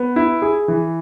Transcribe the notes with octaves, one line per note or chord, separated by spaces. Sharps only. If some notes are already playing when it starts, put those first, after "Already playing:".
Already playing: B3
E4
G#4
E3